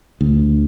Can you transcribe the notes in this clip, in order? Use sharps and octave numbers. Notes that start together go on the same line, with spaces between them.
D2